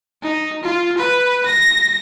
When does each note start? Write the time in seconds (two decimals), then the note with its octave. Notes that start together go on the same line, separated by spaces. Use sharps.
0.22 D#4
0.63 F4
0.98 B4
1.46 A#6